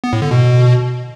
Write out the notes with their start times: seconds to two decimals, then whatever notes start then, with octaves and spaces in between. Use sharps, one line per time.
0.04 B3
0.13 A2
0.22 D3
0.31 B2